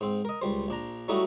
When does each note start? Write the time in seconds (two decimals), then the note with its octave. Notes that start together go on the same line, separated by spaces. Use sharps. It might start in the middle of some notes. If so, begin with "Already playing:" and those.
0.01 G#2 C4
0.25 A#4 D#5
0.41 C#2 G3 C5
0.68 A#1 D4 A#5
1.08 F#3 G3 A3 D#4 E4 F#4